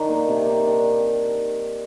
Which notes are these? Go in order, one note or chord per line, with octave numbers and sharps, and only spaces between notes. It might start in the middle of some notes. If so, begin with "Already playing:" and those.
Already playing: D#3 D4
A#3
C3
D#3
D4